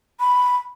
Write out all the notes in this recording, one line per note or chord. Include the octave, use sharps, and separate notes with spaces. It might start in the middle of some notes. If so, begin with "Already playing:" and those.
B5